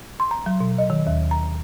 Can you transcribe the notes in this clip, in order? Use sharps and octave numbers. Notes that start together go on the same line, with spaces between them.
C6
A#5
F#3
B2
D#5
D#3
D#2
A#5